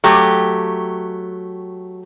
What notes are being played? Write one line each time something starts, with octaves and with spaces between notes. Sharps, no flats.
F#3 A3 G4